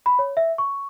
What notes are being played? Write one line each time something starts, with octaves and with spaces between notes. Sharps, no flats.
B5
C#5
E5
C#6